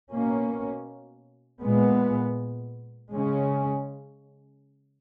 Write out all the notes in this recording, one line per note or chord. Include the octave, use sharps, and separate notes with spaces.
B2 A#3 C#4
A#2 G#3 B3
C#3 G#3 C#4